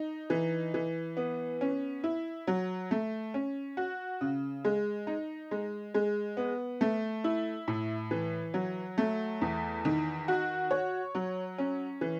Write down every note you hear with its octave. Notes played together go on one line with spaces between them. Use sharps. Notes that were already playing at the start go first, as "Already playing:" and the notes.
Already playing: D#4
E3
E3
B3
C#4
E4
F#3
A3
C#4
F#4
C#3
G#3
D#4
G#3
G#3
B3
A3
E4
A2
E3
F#3
A3
E2
D#3
F#4
C#5
F#3
C#4
E3